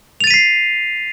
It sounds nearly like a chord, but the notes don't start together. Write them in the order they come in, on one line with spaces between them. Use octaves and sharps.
F7 A6 D#7 B6 C7